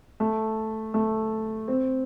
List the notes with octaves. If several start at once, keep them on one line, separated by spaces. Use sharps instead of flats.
A3
A3
C4